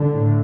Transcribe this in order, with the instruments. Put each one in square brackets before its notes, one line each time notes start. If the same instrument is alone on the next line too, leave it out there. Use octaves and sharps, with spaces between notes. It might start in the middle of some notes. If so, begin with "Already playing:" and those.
Already playing: [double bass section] D3
A2